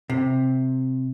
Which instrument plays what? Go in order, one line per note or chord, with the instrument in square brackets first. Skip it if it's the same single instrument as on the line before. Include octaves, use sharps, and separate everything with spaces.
[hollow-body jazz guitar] C3